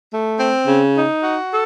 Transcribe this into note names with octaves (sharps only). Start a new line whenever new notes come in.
A3
C4
C#3
D#4
F#4
A4